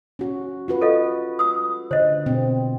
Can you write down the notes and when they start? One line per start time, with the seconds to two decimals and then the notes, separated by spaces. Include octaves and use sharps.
0.19 C#4 F#4
0.68 F4 F#4 B4
0.81 A4 D#5 F5
1.39 D#6 E6
1.91 D3 C5 D#5
2.26 B2 C4